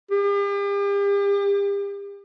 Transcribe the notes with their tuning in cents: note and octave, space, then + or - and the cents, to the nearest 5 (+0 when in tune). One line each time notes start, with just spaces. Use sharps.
G4 +40